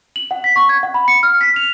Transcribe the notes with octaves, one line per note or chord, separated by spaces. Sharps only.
F#7
F#5
B6
C#6
G#6
F#5
B5
C#7
F6
B6
F7